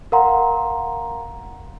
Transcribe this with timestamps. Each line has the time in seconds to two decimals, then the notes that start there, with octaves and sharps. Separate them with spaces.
0.12 A#4 F5 F#5 A#5 C6